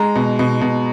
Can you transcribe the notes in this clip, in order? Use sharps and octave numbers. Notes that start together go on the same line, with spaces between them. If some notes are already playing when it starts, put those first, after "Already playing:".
Already playing: G#3 A#5
B2
B2
B2